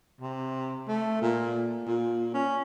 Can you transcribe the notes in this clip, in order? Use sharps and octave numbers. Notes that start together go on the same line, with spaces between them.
C3
A3
A#2
A#2
C#4